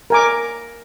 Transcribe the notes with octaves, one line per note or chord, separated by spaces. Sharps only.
A#4 G#5 D6